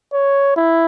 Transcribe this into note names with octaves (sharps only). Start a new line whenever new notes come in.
C#5
E4